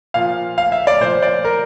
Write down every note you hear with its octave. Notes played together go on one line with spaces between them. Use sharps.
A#2 F3 F5
F5
E5
D5
A#2 F3 C5
D5
A#4